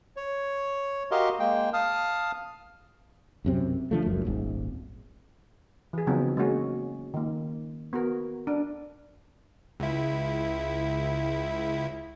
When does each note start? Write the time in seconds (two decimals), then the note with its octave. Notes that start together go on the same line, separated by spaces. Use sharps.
0.17 C#5
1.11 F#4 G4 A#4 D#5 F5 C6
1.40 G#3 A#3 G5
1.73 F5 A5 D#6 F6
3.45 B1 F#2 C3 C4
3.91 D3 F3 A3
4.05 F#1 C#2 F#2
4.25 D#1 G#1 G#2
5.93 E3 G#4
6.07 C#3 F3 F#3 B3 C4 D#4
6.37 G#3 A#3 C#4 F#4 G#4
7.14 D#3 A#3
7.93 B3 F#4 A#4
8.47 D4
9.80 C#2 E4